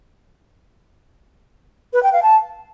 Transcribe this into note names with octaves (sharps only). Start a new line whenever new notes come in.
B4
G5
F5
A5